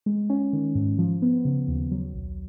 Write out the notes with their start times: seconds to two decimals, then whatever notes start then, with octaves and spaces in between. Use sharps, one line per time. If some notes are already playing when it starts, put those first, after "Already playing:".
0.06 G#3
0.30 C#4
0.53 D#3
0.75 G#2
0.98 F3
1.22 B3
1.45 C#3
1.68 D#2
1.91 F#3
2.14 B1